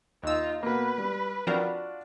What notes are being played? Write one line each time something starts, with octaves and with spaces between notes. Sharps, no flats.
D#2 D#4 F4 E6
B2 A#3 B4
G3
F3 C4 D4 F4 F#4 A#4